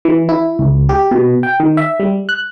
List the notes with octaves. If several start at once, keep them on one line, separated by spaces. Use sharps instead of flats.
E3
E4
C#2
G4
B2
G5
D#3
E5
G3
F#6